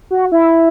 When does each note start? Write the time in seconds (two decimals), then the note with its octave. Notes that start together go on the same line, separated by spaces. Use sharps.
0.11 F#4
0.32 E4